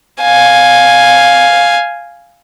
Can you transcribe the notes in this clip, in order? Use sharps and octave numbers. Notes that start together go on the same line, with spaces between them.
F5 G#5